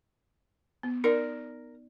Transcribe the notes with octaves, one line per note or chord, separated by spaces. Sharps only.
B3
D#4 A#4 D5